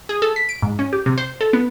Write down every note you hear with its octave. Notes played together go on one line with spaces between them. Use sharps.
G#4
A4
B6
D7
G#2
C#4
G4
C3
C5
A4
B3